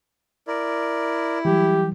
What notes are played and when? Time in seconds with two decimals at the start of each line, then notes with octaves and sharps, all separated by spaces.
0.48 E4 A#4 D5
1.45 E3 F#3 G3 G4